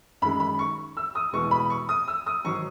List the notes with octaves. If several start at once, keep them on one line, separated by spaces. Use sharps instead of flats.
F#2 D#3 G#3 B5
B5
C#6
E6
D#6
E2 B2 G#3 C#6
B5
C#6
D#6
E6
D#6
G#2 D#3 F#3 C#6